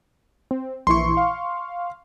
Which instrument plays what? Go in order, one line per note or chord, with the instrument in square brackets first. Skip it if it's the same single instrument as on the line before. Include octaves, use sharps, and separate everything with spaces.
[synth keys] C4
[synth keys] A#1 E3 E4 [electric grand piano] C6 C#6
[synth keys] F5